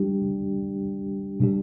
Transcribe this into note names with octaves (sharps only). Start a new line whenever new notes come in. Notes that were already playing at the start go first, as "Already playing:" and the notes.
Already playing: G3 D4 G4
B2 G3 D4 G4